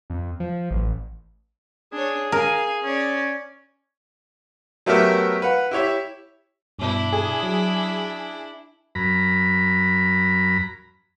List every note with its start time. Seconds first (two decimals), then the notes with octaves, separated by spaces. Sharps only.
0.10 F2
0.40 F3
0.71 A1
1.93 D4 G#4 C#5
2.32 A#4 F5 G#5
2.84 C#4 C#5 D5
4.86 F#3 A3 B3 G4 A#4 E5
5.42 B4 F5 F#5
5.71 E4 G4 C#5 E5
6.79 G2 B2 D4 E4
7.13 G#4
7.43 F#3
8.95 F#2 A#5 B5